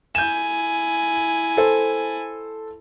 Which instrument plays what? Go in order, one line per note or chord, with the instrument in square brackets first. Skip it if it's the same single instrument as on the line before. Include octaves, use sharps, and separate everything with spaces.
[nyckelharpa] E4 G#5 [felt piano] G6 E7
[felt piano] A4 C5